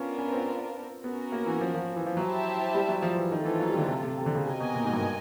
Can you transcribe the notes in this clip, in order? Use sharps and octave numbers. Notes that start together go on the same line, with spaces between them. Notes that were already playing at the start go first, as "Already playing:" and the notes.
Already playing: B3 C#4 D4 F4 A#4
C#4
C4
B3 C#4 F#4 A#4
A#3
E3
F3
F3
E3
F3
F#3 E4 G4 C5 E5 A5
G3
F#3
F3
E3
D#3 A3 C4 F4 A4
E3
F#3
G3
D3
C3
C3
C3
D3
C#3
C3 F#4 A#4 D#5 G#5
B2
A#2
G#2
G2